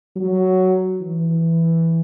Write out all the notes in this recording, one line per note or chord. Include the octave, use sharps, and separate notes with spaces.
F#3
E3